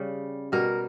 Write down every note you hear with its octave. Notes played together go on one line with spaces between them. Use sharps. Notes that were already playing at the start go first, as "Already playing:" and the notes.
Already playing: C#3 G3
B2 G3 A#4